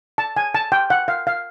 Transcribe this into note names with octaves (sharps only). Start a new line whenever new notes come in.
A5
G#5
A5
G5
F#5
F5
F5